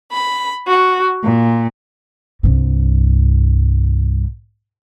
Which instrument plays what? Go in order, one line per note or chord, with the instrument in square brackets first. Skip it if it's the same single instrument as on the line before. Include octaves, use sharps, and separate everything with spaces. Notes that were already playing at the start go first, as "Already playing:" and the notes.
[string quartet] B5
F#4
A#2
[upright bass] C2 G2